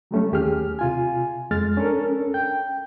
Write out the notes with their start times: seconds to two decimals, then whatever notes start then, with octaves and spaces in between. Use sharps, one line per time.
0.11 F#3 G3 A3 C#4
0.32 D#2 G4 G#4 F6
0.79 C3 F4 G#5
1.51 F2 G#3 F6 A6
1.77 C#4 D4 A4 A#4
2.34 G5 G6